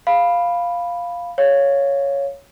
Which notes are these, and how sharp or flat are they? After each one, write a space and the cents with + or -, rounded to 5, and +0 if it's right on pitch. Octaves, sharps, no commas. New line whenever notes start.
F5 +0 B5 +0
C#5 +0 F5 +0